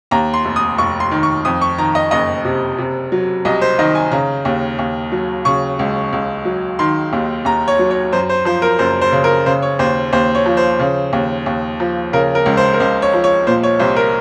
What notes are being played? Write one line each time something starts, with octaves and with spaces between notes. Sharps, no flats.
D#2 A#5
C6
F1
D#6
F1 C#6
C6
D#3
C#6
F2 D#6
C#6
D#3 A#5
D#5
F#1 D#5
C3
C3
F#3
C2 D#5
C5
D#3 D#5
G#5
C#3 A#5
D#2
D#2
F#3
C#3 C#6
C#2
C#2
F#3
D#3 C6
D#2
D#2 A#5
C#5
F#3
C#5
F#2 C5
C5
F3 C5
A#4
F#1 C5
C5
C#3
A#4
C#3 C5
C#5
D#2 C5
D#2 C5
C#5
F3
C5
C#3
D#2
D#2
F3
C#3 A#4
A#4
C#2
C5
A#4
C#2 C5
C#5
F3
C#5
A#2 C5
C#5
C2 C5
A#4